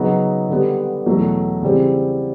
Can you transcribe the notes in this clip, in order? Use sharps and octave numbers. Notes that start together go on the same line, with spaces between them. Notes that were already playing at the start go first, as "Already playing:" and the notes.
Already playing: C#3 F#3 B3 D#4
D3 G3 B3
E2 B2 F#3 A3
C#3 E3 G3 C4